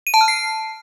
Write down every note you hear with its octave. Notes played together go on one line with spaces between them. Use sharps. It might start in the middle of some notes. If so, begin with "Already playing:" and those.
D#7
A5
F6
C7